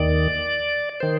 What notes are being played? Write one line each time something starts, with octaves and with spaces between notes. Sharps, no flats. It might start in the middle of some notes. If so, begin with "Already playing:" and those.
Already playing: D#2 D#3 D5
D#3 C5